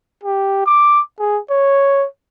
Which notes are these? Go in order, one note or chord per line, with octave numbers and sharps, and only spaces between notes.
G4
D6
G#4
C#5